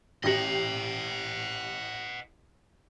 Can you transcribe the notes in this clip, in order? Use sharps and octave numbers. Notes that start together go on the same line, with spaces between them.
A1 G4 D#5 F#5 A#6